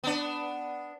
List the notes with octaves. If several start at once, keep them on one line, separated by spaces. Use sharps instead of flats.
B3 D4